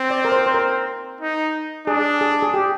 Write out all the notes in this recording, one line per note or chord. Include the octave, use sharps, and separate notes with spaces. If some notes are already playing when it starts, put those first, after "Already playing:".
Already playing: C4
D5
A#4
C5
C5
A#4
D#4
D4 G#4
G#4
G#4
G4